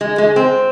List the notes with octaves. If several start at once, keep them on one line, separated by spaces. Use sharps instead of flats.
G#3
G#3
C4